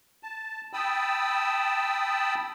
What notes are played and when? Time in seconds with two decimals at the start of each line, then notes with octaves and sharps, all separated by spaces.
0.23 A5
0.73 G5 A5 B5 D#6 E6